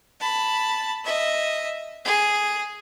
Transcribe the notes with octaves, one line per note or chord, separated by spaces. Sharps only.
A5 B5
D#5 E5
G#4